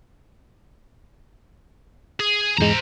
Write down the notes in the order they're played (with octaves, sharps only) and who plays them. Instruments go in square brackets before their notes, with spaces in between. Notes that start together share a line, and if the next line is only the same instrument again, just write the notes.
[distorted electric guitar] G#4
[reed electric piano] E2 G#2 G#3 [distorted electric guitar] C5 A#5